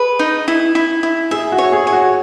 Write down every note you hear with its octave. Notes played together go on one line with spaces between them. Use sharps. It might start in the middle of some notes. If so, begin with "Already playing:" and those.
Already playing: G#4 B4
D#4
E4
E4
E4
G#4 E5
F#4
C#5
G#4
C#5
F#4